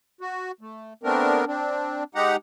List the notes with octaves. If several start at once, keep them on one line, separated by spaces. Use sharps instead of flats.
F#4
A3
A3 B3 C4 D4 A#4
C4 D4
G#3 D#4 G4 F#5 A#5